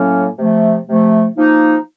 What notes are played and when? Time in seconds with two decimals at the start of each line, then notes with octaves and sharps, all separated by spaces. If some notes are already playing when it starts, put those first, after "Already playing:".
Already playing: A2 F#3 A#3 C#4
0.37 C3 F3 A3
0.87 C3 F3 A3
1.36 F3 A#3 D#4